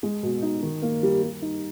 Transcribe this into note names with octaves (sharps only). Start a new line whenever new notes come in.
G#3
B2
D#4
D#3
A#3
G3
G3
D#4